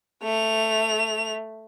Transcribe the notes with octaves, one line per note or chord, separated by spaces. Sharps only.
A3 F7